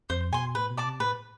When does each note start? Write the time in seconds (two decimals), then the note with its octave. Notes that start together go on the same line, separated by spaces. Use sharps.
0.10 F2 C5
0.32 B2 G#5 C6
0.55 A2 B4
0.70 B2
0.77 D5 A5 D6
0.86 C3
1.00 A2 B4